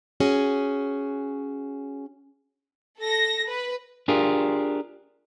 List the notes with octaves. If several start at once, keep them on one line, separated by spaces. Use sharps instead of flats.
C#4 F#4 G#4
A4 A#6
B4
D4 F4 G4 G#4 A#4